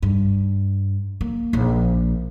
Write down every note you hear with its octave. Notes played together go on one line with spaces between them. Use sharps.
G2
A#3
A#1